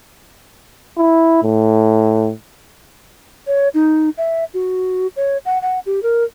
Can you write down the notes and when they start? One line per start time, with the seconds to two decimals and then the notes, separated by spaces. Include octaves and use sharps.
0.98 E4
1.43 A2
3.47 C#5
3.74 D#4
4.18 E5
4.54 F#4
5.16 C#5
5.45 F#5
5.62 F#5
5.86 G4
6.03 A#4